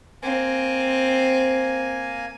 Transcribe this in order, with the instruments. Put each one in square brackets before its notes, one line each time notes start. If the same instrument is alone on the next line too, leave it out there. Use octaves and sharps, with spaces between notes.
[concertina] A#3 G#5 [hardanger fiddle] C4